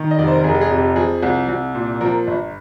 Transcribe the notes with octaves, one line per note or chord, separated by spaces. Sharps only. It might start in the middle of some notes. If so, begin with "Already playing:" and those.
Already playing: D#3
D#5
F1 D5
C5
A#4
F1 G#4
G4
G#4
F2
G4
F3 G#4
C2
C2
A#2
F3 A#4
G1